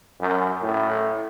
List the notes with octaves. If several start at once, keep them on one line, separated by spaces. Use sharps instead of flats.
F#2
A2